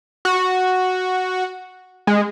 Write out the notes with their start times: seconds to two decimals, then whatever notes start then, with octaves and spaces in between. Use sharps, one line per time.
0.25 F#4
2.07 G#3